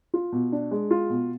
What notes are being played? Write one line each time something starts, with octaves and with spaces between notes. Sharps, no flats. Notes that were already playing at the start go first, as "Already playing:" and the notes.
F4
B2
D4
G#3
F4
B2